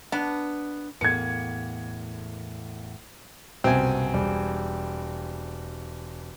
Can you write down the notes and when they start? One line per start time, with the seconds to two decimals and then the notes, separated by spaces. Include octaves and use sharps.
0.12 B3 D4
1.01 E2 A2 A#3 G#6 C#7
3.64 F#1 C2 B2 C4 G#5
4.14 E1 G3